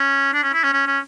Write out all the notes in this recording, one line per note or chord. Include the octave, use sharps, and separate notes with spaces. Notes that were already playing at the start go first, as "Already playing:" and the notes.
Already playing: C#4
D4
C#4
E4
C#4
C#4
C#4